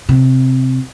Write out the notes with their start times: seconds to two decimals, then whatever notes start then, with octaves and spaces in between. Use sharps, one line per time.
0.09 C3